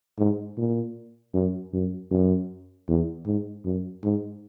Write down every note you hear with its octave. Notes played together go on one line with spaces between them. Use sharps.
G#2
A#2
F#2
F#2
F#2
E2
G#2
F#2
G#2